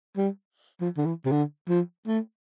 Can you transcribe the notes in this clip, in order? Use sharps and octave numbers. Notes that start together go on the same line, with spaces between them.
G3
F3
D3
E3
C3
D3
F3
A3